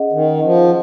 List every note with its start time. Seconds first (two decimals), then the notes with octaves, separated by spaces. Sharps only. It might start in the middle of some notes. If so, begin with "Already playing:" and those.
Already playing: C#4 G#4 D#5 F#5
0.12 D#3
0.43 F3